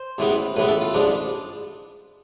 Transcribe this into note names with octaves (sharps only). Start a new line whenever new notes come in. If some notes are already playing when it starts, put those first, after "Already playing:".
Already playing: C5
A1 A2 E3 G#3 B3
A1 A2 E3 G#3 B3 B4
A4
F4
A1 G#2 F3 G#3 D4